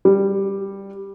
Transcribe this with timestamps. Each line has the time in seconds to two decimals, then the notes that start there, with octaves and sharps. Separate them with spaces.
0.05 G3